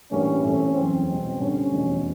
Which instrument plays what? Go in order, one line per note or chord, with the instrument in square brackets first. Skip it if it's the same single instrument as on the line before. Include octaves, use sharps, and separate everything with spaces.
[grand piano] A1 G2 E3 G3 A#3 [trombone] C#4
[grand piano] G1 G2 E3 A3 C4 [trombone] C#4
[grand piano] F#1 E2 C#3 [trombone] C4
[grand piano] C2 B2 G#3 C#4
[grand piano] G2 D3 G3 C4 [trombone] C#4
[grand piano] F1 E2 B2